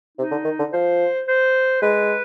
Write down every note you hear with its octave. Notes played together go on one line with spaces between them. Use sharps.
C3 D#4
D3
D#3
D3
F3 C5
C5
G#3 B4